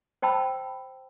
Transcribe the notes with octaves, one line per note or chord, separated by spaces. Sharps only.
C5 G5 A5 B5 E6